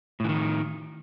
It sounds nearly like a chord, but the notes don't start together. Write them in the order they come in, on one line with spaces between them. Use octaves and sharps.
A2 E3 D#3